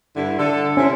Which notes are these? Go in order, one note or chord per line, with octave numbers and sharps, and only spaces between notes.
G2 D3 E4
D3 A4
C3 C#4 E4